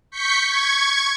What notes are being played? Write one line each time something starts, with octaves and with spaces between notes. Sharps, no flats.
C#6 G6 B6 C#7
C#6 G#6